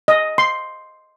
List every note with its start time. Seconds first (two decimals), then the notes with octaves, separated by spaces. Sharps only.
0.08 D#5
0.38 C6